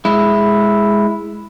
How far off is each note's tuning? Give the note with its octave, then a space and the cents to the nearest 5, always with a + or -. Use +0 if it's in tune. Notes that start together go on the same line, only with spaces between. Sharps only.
G#3 +0 E4 +0